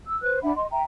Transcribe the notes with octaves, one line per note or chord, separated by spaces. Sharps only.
E6
B4 C5 F#6
D4 E5 F#5 B5
D#5 C6
E5 G5 A#5